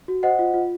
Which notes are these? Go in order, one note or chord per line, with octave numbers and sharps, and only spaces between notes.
F#4
C5 D#5 F#5
F4
F4